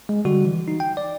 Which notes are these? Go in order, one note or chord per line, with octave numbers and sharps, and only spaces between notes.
G#3
D3 G3 F#4
E3
D#4
G5
D5